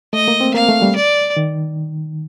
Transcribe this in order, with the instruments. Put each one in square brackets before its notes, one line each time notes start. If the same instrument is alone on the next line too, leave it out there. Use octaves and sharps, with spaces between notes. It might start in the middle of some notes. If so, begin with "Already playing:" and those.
[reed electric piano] A3 [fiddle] D#5
[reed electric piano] A#3
C4
[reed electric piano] A#3 [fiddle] F5
[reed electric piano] A3
G3
[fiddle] D5
[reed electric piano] D#3